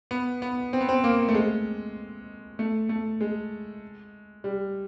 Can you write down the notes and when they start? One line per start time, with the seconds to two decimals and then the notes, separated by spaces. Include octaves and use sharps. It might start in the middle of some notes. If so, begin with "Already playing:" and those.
0.11 B3
0.42 B3
0.73 C4
0.81 B3
0.89 C4
1.04 A#3
1.28 A3
1.35 G#3
2.59 A3
2.89 A3
3.21 G#3
4.44 G3